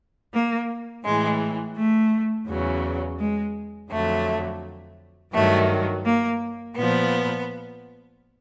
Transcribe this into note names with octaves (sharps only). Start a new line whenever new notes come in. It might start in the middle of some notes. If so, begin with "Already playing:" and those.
A#3
A2 E3 G#3
A3
E2 C#3 F#3
G#3
F2 D3 F#3 A3
G2 D#3 F#3 A3
A#3
A#2 F3 B3